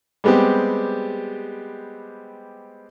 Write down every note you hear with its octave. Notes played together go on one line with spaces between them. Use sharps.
G3 G#3 B3 C4 G4